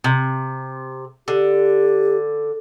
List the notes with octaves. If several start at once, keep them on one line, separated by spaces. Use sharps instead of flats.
C3
D3 G4